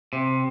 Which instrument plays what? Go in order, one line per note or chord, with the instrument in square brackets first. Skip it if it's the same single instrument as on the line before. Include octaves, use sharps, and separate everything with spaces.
[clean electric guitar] C3